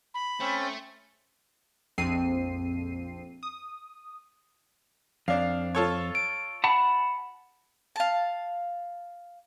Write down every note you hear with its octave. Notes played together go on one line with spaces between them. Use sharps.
B5
A3 C4 C#4
A#1 F2 F3 C4 C7 D#7
D#6
F2 D4 F5
F4 A4 C#5
D7
F#5 A5 B5
F5 A5